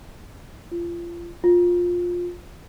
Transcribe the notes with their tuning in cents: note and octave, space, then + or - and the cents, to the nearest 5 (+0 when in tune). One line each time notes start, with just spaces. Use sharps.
F4 -30
F4 +15